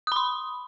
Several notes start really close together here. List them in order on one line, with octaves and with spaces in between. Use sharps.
D#6 B5 C6